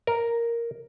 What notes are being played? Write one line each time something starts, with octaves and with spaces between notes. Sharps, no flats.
A#4